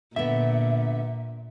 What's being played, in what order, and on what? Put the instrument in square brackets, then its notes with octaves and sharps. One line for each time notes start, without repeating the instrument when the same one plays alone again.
[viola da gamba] A#2 [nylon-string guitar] D3 B3 [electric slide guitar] E5